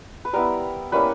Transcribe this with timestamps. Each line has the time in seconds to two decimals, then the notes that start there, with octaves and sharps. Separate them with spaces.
0.25 B4
0.33 G3 B3 E4 A#4
0.92 G3 A#3 C#4 E4 B4